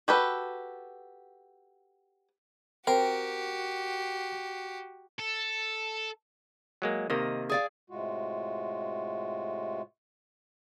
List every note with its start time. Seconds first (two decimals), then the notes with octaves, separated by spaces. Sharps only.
0.08 F#4 G4 A4 B4
2.87 C4 F#4 G4 A#4
5.19 A4
6.82 F#3 G#3 A#3
7.10 C3 D#3 A#3 D#5
7.49 G#4 D5 F5
7.90 A2 C3 G#3 F4 F#4